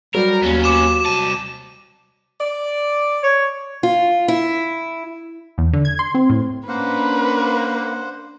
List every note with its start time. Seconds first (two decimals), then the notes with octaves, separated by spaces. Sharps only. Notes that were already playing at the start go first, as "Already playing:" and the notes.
0.15 F#3 G3 A#4
0.43 D#2 B3 C#4
0.64 D6 E7
1.06 C2 A5 D#7
2.40 D5
3.23 C#5
3.83 F4
4.28 E4
5.58 E2
5.73 D3
5.85 G#6
5.99 C6
6.15 C4
6.30 A2
6.69 A#3 C#4 D4 B4 C5 F#5